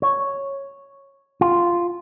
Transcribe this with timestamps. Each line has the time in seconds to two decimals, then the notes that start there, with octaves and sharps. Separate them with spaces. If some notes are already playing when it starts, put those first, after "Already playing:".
0.02 C#5
1.41 F4